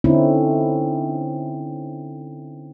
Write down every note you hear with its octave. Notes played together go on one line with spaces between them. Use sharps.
D3 C4 C#4 D#4 E4